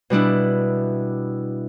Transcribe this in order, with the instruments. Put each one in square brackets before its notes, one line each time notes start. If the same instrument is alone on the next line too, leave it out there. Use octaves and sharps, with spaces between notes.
[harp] B2 G3 D4 E4